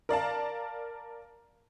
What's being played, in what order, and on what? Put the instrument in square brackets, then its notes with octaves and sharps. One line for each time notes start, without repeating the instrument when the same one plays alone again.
[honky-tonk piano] A#4 D5 F5 A5